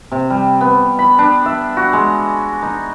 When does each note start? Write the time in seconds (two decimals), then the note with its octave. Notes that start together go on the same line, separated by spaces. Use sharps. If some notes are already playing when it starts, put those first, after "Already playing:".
0.12 C3
0.30 G3
0.61 B3
0.99 B5
1.19 D4
1.46 E5
1.77 F#4
1.93 G#3
2.62 D#4